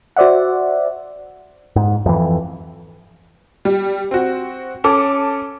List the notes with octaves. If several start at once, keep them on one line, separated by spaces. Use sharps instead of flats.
F#4 C5 D5 E5 F#5
G#2
F2 E3
G3
C4 F#4
C#4 A4 D6